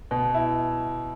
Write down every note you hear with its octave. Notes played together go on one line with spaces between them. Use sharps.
B2
E4